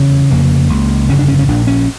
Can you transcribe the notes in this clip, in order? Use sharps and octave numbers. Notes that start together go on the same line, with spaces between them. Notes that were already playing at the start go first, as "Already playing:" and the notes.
Already playing: F1 E2 C#3 C#4
F1 F2 C#3 A#3
C#2 C#3
G1 F2 C#3 C#4
D4
C#4
C#4
A#1 A#2 D4
C#4